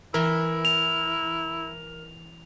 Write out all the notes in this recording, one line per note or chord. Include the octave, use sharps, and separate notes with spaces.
E3 E4 A#4
F7